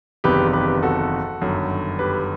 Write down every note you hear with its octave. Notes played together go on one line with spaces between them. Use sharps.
F#1 E2 C3 D#3 G4 B4
G4 B4
F#4 A4
G1 F#2 D#3
G4 B4